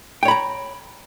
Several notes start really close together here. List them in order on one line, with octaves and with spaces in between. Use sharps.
G5 C#5 B5 A#5